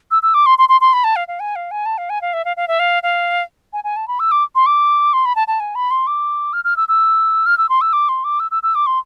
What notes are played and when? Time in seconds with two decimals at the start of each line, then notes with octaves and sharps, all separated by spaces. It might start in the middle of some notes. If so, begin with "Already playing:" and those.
0.11 E6
0.23 E6
0.34 D6
0.46 C6
0.58 C6
0.69 C6
0.81 C6
0.93 B5
1.04 A5
1.16 F5
1.28 F5
1.40 G#5
1.56 F5
1.71 G#5
1.86 A5
1.98 F5
2.10 G#5
2.21 F5
2.33 E5
2.45 F5
2.57 F5
2.68 E5
2.79 F5
3.03 F5
3.73 G#5
3.84 G#5
3.96 A5
4.08 B5
4.20 E6
4.31 D6
4.55 C6
4.66 D6
5.13 C6
5.25 B5
5.36 A5
5.48 A5
5.60 G#5
5.75 B5
5.91 C6
6.07 D6
6.53 F6
6.64 F6
6.77 E6
6.88 E6
7.46 F6
7.58 E6
7.69 C6
7.81 E6
7.93 D6
8.09 C6
8.24 D6
8.40 E6
8.51 E6
8.63 E6
8.75 D6
8.86 C6